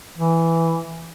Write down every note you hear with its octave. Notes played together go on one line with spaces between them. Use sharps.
E3